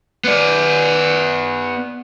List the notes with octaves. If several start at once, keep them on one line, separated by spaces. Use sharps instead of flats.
B3 D5